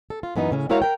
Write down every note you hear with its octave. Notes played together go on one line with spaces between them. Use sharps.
A4
F4
F#2 E3 B3 D#4
A2 C#3 C#4
G#3 E4 F#4 A#4 C#5 F5
A#4 G5